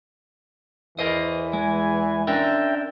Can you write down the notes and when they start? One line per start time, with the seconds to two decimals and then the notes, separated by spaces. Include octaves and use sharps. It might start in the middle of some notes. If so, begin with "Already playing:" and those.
0.99 E2 E3 A#4 C5 D#5
1.53 G#3 G#5
2.27 C#4 D4 A#4 E5 G5